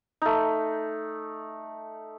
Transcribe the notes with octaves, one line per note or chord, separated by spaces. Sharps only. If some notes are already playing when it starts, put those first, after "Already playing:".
A3 D#4